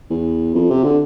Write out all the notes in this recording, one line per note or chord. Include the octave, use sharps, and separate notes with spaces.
E2
F2
C3
D3